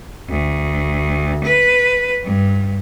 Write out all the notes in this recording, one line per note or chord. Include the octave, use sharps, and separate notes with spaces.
D2
B4
G2